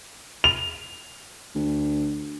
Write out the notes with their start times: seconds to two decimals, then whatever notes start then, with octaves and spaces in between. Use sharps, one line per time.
0.44 F7
1.55 D2